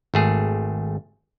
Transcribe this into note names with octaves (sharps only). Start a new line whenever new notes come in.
G#1 A3 G#4